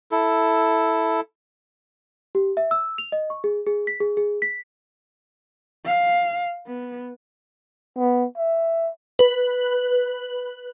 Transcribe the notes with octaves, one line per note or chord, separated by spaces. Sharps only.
E4 A4
G4
E5
E6
F7
D#5
C#6
G#4
G#4
B6
G#4
G#4
B6
F5
B3
B3
E5
B4